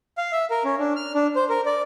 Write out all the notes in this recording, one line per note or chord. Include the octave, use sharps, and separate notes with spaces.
F5
E5
A#4
C#4
D4
F6
D4
C5
A#4
D5